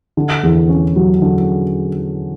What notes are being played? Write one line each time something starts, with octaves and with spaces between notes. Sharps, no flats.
D3
E2
C#4
F#3
D3